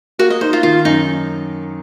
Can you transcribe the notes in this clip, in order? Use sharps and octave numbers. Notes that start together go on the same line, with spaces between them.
A#3 F#4
D#5
D#4 C5
F4
D#3 F4
F#2 D#4